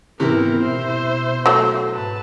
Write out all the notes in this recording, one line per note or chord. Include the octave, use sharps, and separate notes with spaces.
G#2 C3 E3 B3 E4 A#4
B2 E4 C5
F#3 A3
G#2 B4 A5